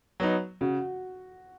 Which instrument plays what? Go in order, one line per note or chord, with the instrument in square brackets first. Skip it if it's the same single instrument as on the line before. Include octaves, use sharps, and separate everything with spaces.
[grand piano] F#3 B3 D#4
[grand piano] C#3 [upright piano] F#4